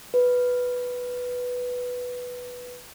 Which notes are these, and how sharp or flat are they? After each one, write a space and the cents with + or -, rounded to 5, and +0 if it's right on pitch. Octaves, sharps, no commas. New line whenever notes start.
B4 +0